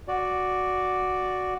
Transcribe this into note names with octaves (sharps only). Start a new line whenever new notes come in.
F#4 D5